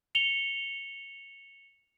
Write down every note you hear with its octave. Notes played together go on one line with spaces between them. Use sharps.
C#7 F7 G7